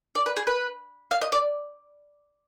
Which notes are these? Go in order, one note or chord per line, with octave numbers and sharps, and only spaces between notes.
D5
B4
G#4
B4
F5
D#5
D5